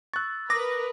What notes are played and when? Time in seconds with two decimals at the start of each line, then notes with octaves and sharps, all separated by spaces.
0.13 C#6 E6 F#6 A6
0.50 A#4 B4 D6 D#6 A#6